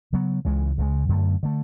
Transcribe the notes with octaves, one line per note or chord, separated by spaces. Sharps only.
C#3 F#3 B3
C#2 C#3 E3 G#3
C#2 C#3 E3 G#3
F#2 D3 A3
D3 A3